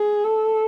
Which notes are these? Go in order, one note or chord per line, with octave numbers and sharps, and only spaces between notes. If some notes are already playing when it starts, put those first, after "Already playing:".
Already playing: G#4
A4